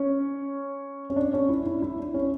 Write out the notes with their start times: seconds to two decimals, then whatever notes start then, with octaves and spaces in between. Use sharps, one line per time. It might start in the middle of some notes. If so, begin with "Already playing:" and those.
Already playing: C#4
1.10 C#4
1.16 D4
1.34 C#4
1.49 E4
1.66 E4
1.82 E4
1.99 D4
2.14 C#4